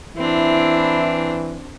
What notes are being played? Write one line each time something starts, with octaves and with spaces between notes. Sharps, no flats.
E3 C4 D4 E4